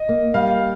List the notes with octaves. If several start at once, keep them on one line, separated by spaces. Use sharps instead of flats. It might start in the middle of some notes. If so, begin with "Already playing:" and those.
Already playing: D#5
A#3
G3 F5